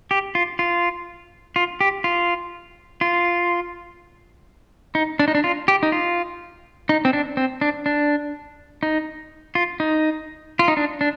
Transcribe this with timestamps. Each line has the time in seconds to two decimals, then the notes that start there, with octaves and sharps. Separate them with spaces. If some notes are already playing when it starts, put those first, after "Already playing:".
0.11 G4
0.35 F4
0.59 F4
1.56 F4
1.81 G4
2.04 F4
3.01 F4
4.95 D#4
5.19 D4
5.28 D#4
5.35 D4
5.44 F4
5.68 G4
5.83 D#4
5.92 F4
6.89 D#4
7.05 C4
7.13 D4
7.37 C4
7.61 D4
7.86 D4
8.83 D#4
9.55 F4
9.80 D#4
10.59 F4
10.68 D#4
10.77 D4
11.01 D4